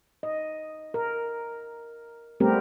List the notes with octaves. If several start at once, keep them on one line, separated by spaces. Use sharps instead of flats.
D#5
A#4
G3 A3 B3 C4 G4 A#4